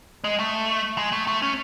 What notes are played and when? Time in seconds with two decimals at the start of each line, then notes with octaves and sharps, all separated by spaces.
0.24 G#3
0.39 A3
0.98 G#3
1.13 A3
1.28 A3
1.42 C#4